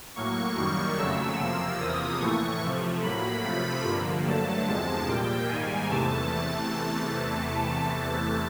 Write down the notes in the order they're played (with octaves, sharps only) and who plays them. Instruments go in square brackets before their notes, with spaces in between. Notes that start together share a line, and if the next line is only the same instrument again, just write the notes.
[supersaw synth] A2 F#3 A#3 C#6
F#2 D#3 G3 A#3
F2 C#3 F#3 A3 E6
C3 F3 A#3
E2 C3 F3 A#3 D#6
A2 E3 A3 C#6
C3 F3 A3
A2 F#3 A#3 B5
C3 F3 A3
G2 D3 F3 A#3
G2 D3 F#3 A3 A5
E2 C3 F3 G#3 A5
A#2 G3 A#3 G5
G#2 D#3 G3 A#3 G#5
E2 C3 E3 A3 A5